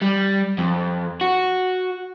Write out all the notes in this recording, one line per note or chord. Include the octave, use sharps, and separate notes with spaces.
G3
F2
F#4